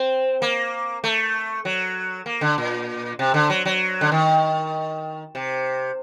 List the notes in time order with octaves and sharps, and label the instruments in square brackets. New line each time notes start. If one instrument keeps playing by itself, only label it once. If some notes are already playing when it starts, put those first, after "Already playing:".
Already playing: [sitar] C4
A#3
A3
F#3
A#3
D3
A#2
C3
D3
F#3
F#3
D3
D#3
C3